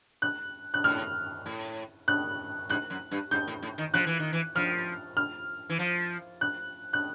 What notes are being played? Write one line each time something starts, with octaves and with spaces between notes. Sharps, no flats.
F#6
F#6
A2 F6
A2
F#6
G#2 F#6
F#2
G2
G#2 G6
A2
A2
D#3
F3 F#6
E3
D#3
E3
F3 F6
F6
E3
F3
F#6
F#6